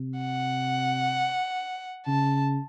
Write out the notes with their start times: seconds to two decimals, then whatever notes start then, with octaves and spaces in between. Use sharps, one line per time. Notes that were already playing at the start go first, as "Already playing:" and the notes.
Already playing: C3
0.19 F#5
2.07 C#3 A5